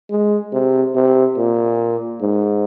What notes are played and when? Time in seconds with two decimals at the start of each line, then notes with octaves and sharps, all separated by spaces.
0.11 G#3
0.53 C3
0.95 C3
1.37 A#2
2.22 G#2